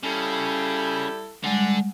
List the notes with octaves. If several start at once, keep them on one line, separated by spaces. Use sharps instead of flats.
C#3 G3 E4 A4
D3 G3 G#3 D4 F#5